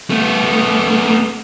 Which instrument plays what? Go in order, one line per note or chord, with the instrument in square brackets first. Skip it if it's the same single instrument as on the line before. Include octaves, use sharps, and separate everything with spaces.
[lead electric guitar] A3 B3